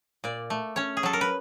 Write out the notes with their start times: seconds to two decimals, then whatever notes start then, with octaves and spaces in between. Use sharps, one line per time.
0.24 A#2 D5
0.50 A3
0.76 C#4 C#5
0.97 G#4
1.03 F#3 A4
1.13 A#4
1.21 B4